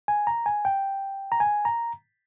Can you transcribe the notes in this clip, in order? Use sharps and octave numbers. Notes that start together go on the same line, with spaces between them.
G#5
A#5
G#5
G5
A#5
G#5
A#5